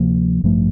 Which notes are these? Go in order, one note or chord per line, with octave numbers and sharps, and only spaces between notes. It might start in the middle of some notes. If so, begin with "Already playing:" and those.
Already playing: D2 C3 F3 A#3
A1 G2 F3 A3